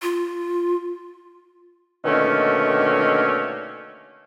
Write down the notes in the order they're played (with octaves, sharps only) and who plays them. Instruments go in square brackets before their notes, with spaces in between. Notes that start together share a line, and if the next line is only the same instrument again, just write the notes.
[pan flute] F4
[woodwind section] B2 D3 D#3 A3 A#3 C#4